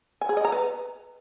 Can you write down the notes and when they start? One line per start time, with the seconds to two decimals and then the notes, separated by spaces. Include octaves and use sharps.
0.21 G#5
0.29 G#4
0.37 D#5
0.45 A#5
0.52 B4